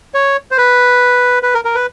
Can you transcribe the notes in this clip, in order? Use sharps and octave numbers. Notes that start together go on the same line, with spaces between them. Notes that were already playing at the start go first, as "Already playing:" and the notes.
C#5
C5
B4
B4
A#4
A#4
B4